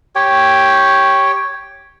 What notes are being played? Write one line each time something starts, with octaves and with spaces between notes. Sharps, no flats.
G4 C#5 G5